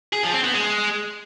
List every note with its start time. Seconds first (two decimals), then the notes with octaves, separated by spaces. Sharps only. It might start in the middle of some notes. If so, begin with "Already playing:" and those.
0.13 G#4
0.23 F3
0.34 C4
0.44 B3
0.55 G#3